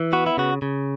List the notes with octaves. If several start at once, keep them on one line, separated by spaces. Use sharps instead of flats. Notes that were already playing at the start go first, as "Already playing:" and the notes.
Already playing: E3
B3 F#4
E4
C#3 F#4
C#3